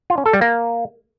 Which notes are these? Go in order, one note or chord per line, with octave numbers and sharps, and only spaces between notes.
F4
C#4
A4
G3
A#3